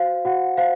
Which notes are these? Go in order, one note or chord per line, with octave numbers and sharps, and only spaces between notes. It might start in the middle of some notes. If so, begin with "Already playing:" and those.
Already playing: F#4 C5 F5
F#4 F#5
C5 F5